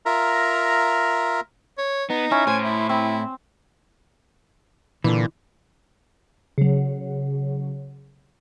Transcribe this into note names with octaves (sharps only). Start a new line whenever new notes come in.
F4 A#4 E5 A#5
C#5
B3 D#4
C#4 E4
A2 C5 G#5
E4
C4 E4
A#2 D3 E3
C#3 F#3